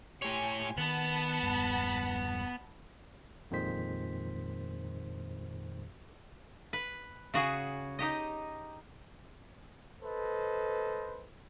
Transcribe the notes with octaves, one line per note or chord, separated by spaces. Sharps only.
A2 G4 C#5 G#5 C6
D#3 B3 F#5 A5 B5
E1 G2
F2 A#2 D#3 G#3 C5 B6
B4
C#3 F#4 G#4
D#4 G4 D#5
A4 B4 C5 D#5